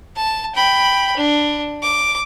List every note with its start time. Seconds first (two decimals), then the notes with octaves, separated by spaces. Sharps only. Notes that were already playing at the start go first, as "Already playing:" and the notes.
0.16 A5
0.55 G5 B5
1.17 D4
1.83 D6